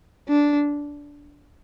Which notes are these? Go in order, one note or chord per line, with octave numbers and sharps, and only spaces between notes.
D4